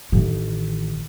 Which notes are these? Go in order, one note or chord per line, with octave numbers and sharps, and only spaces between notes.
A1 D#3